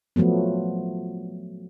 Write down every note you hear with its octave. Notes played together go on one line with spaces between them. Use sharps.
F3 F#3 A3 B3